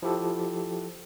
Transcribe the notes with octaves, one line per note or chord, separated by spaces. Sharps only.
F3 E4 G4 A4